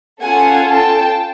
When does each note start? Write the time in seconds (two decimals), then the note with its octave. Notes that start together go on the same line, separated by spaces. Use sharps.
0.21 C#4 F4 A4 F#5 G#5
0.71 G5 A5